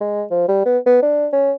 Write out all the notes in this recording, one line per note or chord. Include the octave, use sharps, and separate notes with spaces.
G#3
F3
G3
B3
B3
D4
C#4